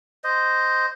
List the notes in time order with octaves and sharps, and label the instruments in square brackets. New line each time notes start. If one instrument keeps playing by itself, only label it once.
[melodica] C5 D#5